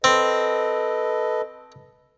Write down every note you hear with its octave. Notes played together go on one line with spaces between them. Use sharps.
C4 A4 B4 D#5